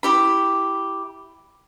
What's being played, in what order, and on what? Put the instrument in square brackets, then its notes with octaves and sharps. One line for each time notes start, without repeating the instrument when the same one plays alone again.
[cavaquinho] E4 G4 B5